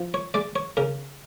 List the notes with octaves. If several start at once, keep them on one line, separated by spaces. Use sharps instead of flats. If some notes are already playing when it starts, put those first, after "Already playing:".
Already playing: F3
C#5
G#3 D5
C#5
C#3 A#4